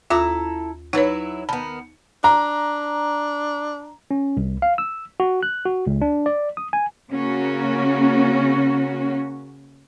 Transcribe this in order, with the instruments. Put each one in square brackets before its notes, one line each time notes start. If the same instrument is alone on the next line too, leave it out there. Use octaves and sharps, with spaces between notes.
[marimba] D#2 F4 D6 [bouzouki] E4 A4 A#5
[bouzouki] F#3 E4 [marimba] D#4 B4 C#5
[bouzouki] D#3 B3 [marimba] A5 B5
[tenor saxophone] D4 [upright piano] A#5
[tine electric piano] C#4
C2
F5
E6
F#4
F#6
F#4
C#2
D4
D5
D#6
G#5
[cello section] C#3 A#3 C#4 F#4